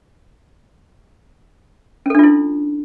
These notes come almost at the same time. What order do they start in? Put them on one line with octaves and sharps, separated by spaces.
C#4 A4 D4 F4 E4